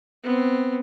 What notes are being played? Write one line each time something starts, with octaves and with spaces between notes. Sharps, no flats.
B3 C4